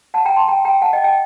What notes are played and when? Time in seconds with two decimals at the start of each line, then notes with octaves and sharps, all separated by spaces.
0.14 F#5 A5
0.25 G5 A#5
0.37 A5 C6
0.48 G5 A#5
0.65 G5 A#5
0.82 F#5 A5
0.93 D#5 G5
1.04 D#5 G5